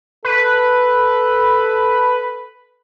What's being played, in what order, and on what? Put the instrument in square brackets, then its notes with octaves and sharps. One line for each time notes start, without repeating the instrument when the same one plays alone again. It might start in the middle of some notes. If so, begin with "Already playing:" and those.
[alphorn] A4 [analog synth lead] B4